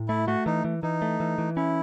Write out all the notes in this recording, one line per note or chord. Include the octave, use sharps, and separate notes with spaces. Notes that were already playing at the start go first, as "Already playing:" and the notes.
Already playing: A2
A3 E4
A3 F#4
E3 D#4
E3
E3 D#4
A3
E3
E3
C#4 E4